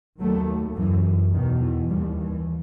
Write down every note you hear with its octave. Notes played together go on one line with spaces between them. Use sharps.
D#2 F#3 A3
F#2 E3
E2 B2 D#3
E3
D#2 E3 G3
E3